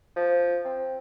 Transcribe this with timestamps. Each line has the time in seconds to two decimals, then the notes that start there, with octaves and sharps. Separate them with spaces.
0.16 F3
0.65 C4